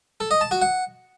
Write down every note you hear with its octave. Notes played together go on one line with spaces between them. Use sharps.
A4
D#5
A5
F#4
F#5